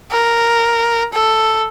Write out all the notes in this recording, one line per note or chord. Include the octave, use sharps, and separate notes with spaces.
A#4
A4